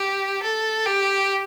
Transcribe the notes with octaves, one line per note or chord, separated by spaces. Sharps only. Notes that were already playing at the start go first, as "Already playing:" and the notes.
Already playing: G4
A4
G4